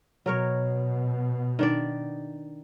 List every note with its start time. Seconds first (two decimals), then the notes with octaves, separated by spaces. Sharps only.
0.26 B2 F#3 A#4 C#5
1.59 D#3 D4 D5